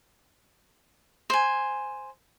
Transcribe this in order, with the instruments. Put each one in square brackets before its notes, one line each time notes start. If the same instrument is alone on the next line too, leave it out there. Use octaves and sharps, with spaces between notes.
[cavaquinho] C5 G#5